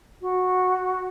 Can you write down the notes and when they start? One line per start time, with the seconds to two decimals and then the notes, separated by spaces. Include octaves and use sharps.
0.21 F#4